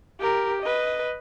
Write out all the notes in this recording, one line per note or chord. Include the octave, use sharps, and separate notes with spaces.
G4 A#4
B4 D#5